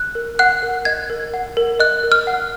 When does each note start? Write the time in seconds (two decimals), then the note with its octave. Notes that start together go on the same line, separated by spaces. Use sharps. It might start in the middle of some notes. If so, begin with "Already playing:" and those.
Already playing: F#6
0.15 A#4
0.39 F#5 F#6
0.63 A#4
0.85 D#5 G#6
1.10 A#4
1.34 F#5
1.57 A#4
1.80 D#5 F#6
2.04 A#4
2.12 F6
2.27 F#5